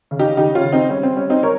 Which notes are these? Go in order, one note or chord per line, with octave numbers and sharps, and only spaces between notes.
C#3
D#4 G4
C#3 D#4 G4
C#4 F4
C#3
C4 D#4
G3 C#4
C4
G3 C#4
C4 D#4
G3 A#4 C#5